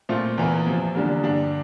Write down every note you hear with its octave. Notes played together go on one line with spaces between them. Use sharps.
A#2 A3 C4 F4
E2 E3 A#3
F2 C3 F3
E2 D3 G3 A#3
G2 D3 G3 D4 G4